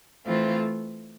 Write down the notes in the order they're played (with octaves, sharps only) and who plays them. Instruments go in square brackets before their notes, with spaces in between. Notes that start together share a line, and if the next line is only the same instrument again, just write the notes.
[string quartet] E3 A3 C4 F4